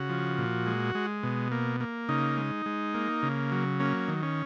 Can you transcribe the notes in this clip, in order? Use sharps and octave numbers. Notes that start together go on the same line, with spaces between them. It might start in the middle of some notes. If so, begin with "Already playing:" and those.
Already playing: C#3 F#4
F3
A#2
G#3
G#3
B2
A#3
A#3
C#3 D#4
G#3
G#3
A#3
C#3
F#3
A#3 C#4
D#3
C#4